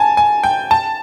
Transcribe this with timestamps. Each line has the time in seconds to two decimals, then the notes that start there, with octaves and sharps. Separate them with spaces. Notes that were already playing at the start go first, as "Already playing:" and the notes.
Already playing: G#5 A5
0.17 G#5
0.43 G5
0.71 A5